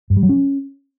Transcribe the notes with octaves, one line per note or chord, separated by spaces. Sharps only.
G2
G3
F#3
C#4